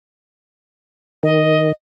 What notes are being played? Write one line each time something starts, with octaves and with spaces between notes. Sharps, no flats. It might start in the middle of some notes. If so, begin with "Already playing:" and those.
D#3 D#5